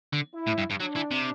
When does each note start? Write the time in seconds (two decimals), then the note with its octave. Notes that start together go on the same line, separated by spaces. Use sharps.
0.13 D3
0.35 E4
0.47 A2
0.58 G2
0.70 G2
0.80 F#3 D4
0.96 E3
1.11 C3